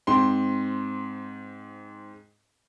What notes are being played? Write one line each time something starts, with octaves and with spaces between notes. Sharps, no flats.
G#2 C4 C6